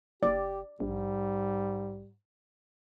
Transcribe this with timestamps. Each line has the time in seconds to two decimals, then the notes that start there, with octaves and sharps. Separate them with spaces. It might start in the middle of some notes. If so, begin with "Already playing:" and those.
0.23 F#1 G4 D5
0.80 A#1 G#2 G3